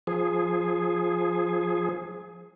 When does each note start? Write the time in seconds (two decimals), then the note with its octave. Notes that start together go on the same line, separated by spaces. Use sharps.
0.07 F3 G#4